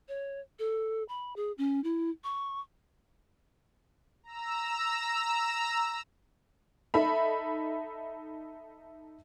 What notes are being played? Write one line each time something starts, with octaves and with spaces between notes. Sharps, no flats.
C#5
A4
B5
G#4
C#4
E4
C#6
A#5 E6
D#4 A4 E5 B5